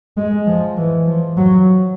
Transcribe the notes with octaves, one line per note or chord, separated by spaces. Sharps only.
G#3
F3
E3
F3
F#3